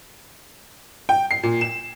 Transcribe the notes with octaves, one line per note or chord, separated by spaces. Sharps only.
G5
C7
A#2
E7